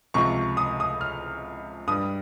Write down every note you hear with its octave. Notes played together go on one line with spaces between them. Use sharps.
C#2 C3 F3 C#6
D#6
D#6
F6
G2 G3 D#6